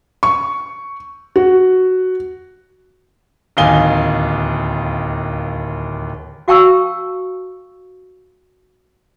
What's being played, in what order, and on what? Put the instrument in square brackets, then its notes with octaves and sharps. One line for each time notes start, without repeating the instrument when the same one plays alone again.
[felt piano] C#6
F#4
[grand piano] D1 D#2 D#4 F5 G#5 G7
[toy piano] F#4 F5 G5 A5 C#6 E6